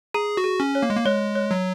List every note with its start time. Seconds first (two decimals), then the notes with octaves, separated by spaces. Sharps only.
0.14 G#4 A#5
0.37 F#4
0.44 G#4
0.60 C#4
0.75 C#5
0.83 A#3
0.90 G#3
0.97 A#3
1.06 G#3 C#5
1.35 C#5
1.51 F#3